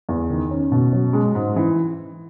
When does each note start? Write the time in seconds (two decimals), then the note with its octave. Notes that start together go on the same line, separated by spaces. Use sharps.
0.09 E2
0.30 D#3
0.51 C#4
0.72 B2
0.93 F#3
1.13 G#3
1.35 G#2
1.56 E3